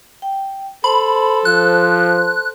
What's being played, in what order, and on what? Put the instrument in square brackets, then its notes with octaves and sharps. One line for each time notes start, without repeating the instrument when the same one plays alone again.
[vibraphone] G5
[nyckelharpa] A4 [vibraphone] C5 A5 C6 [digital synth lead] B5
[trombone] F3 [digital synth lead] F#6